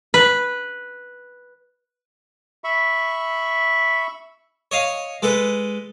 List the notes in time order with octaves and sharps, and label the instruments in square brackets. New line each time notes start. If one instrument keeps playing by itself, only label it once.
[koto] B4
[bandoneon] E5 B5 C#6
[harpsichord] C#5 D#5 F5
G#3 A4 B4